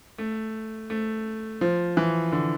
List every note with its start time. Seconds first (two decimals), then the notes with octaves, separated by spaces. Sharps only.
0.18 A3
0.90 A3
1.61 F3
1.97 E3
2.32 D3